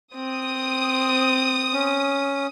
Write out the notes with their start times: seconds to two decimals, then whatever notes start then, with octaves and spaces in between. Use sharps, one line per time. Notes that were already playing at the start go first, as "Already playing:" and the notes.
0.15 C4 D#6
1.73 C#4